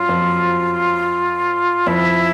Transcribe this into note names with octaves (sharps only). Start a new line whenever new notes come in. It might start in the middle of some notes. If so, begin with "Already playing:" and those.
Already playing: F#2 F#3 F4
F2 F3
F2 F3 E4